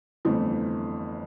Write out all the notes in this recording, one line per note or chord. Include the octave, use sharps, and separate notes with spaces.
G1 F2 E3 A3